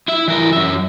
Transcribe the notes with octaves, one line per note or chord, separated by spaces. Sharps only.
E4 E5
E3 A#4
F#2 E5